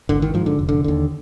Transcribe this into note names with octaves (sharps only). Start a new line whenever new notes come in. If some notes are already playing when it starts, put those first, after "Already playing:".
G#1 D3
D#3
G#2 F3
D3
F1
D3
D#2 D3